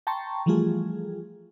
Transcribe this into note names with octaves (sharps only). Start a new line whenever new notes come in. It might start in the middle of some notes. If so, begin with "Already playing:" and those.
G5 A5 A#5 C6 C#6
E3 F3 G3 A3 F4 G#4